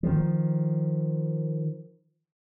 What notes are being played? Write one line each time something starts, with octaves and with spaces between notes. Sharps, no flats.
D#3 F3